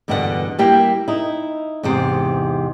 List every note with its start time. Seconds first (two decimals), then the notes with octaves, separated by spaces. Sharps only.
0.08 E2 G2 B2 D3 B4 F#5
0.59 G3 A#3 E4 G4 G5
1.08 D#4 E4
1.83 E2 G#2 C3